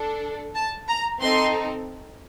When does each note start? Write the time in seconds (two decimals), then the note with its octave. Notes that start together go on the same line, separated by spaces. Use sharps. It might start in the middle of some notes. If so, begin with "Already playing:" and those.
Already playing: D4 A4
0.56 A5
0.88 A#5
1.21 C4 D#4 A4 C6